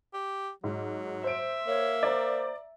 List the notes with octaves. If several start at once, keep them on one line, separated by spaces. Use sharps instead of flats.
G4
G#2 F#3
C5 E5 D7
A#3 C#5
C5 D5 A#5